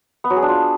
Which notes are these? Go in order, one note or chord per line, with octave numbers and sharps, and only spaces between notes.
B3
F#3
G#4
D4
F4